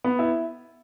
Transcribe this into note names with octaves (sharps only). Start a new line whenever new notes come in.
B3
E4